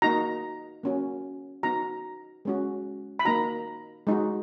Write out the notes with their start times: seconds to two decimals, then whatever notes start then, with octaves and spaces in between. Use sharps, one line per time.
0.02 A#3 D#4 F#4 A#5
0.83 A#3 C#4 F#4
1.63 B3 D#4 F#4 A#5
2.45 G#3 C#4 F#4
3.19 B5
3.25 A#3 D#4 F#4 A#5
4.07 G#3 D#4 F#4